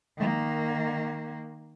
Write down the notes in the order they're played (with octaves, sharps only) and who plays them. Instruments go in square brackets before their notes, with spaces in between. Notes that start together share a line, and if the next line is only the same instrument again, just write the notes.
[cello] D#3 A#3